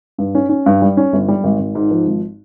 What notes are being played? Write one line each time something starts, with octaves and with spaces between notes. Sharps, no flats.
G2
C#4
C#4
G2
G3
C#4
G1
G3
G#1
G#1
G#2
F3
G#1